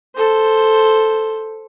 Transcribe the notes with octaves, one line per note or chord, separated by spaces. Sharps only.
A4 C5